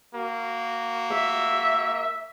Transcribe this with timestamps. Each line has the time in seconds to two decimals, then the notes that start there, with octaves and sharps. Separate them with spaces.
0.15 A#3 F#4
1.12 E5